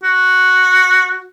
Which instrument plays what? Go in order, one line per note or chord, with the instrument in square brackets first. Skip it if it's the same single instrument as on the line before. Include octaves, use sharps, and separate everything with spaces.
[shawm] F#4